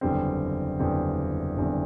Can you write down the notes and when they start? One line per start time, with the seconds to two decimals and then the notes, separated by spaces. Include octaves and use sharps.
0.01 F#1 E2 D3 G3 C4
0.79 F#1 E2 D3 G3 C4
1.57 F#1 E2 D3 G3 C4